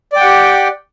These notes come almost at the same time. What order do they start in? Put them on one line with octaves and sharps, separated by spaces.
D5 G5 F#5 G4